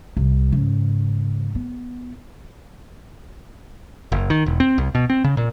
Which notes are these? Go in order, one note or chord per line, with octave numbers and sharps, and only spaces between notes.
C2
G#2 C#3
B3
F#1
D#3
E1
C4
C2
B2
C4
C#3
A#2